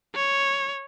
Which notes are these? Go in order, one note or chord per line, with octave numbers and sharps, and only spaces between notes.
C#5